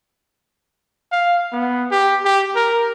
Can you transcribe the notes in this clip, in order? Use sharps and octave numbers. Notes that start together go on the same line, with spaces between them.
F5
B3
G4
G4
A#4